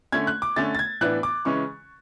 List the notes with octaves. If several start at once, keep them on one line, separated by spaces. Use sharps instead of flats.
D3 A3 C#4 G#6
F#6
D6
D3 A3 C#4 A6
A6
G#6
A2 E3 B3 D4 F#6
D6
C#3 E3 G#3 C#4 C#6